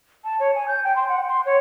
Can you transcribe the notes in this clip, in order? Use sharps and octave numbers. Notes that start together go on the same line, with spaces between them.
A5
C#5
G#5
G6
G5
C6
F#5
C6
C#5